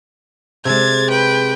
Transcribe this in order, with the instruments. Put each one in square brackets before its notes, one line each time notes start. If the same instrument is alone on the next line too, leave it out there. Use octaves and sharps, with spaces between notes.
[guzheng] C3 G#3 [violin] G#6 A6
[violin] B4 G5